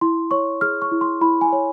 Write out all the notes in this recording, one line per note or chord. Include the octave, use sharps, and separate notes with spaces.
E4 C6
C#5 C#6
G#4 F6
C#6
E4
C6
E4 B5
G#5
C#5